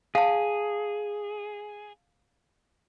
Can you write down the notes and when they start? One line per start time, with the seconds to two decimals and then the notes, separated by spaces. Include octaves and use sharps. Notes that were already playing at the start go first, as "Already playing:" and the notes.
0.15 G#4 F5 A5